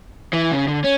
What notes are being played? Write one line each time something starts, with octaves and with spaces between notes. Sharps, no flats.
E3
C#3
D3
C#4